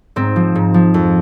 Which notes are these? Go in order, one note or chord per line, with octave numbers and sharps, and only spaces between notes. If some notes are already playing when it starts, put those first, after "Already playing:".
G#2 C4
F3
G#2
F3
F2